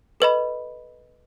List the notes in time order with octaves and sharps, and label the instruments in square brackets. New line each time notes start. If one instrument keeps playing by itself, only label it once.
[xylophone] A4 B4 D#5 B5